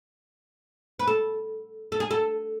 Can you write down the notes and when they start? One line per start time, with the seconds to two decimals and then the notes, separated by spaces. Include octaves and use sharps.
0.99 B4
1.07 A4
1.92 A4
2.00 G#4
2.11 A4